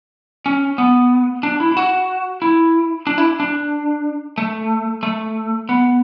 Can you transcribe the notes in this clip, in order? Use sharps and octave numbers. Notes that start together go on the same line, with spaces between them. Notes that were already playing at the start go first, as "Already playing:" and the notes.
C#4
B3
D4
E4
E4
F#4
E4
D4
E4
D4
A3
A3
B3